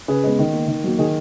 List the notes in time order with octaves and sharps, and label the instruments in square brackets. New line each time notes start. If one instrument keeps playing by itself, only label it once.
[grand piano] C#3 G#4 B4
G#3 B3
D#3
A#3
D#3
F#3 A#3
D#3 G#4